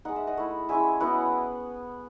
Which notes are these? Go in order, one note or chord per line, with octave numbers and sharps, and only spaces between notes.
G#3 D#4 F#5
E5
D#5 F#5
A3 E4
G#3 C#4 E4 E5 G#5
F#3 B3 E4 D#5 F#5